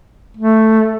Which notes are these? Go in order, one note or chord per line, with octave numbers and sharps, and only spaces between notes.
A3